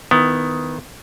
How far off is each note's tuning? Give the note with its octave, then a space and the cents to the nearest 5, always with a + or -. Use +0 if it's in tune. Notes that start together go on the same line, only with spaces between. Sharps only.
D#3 +0 B3 +15 E4 +10